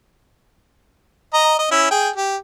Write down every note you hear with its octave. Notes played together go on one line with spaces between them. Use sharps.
D#5 A#5
D#5
C#4 E4
G#4 G5
G4